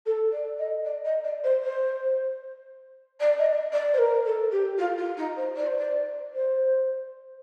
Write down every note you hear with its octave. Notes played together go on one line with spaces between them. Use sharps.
A4
D5
D#5
D5
D#5
D5
C5
C5
D5
D#5
D5
D5
C5
A#4
A4
G4
F4
F4
D#4
C5
D5
C5
D5
C5